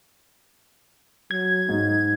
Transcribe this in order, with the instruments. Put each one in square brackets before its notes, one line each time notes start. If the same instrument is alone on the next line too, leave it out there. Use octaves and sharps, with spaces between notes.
[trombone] F#3 [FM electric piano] G#6
[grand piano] G#2 [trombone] D#4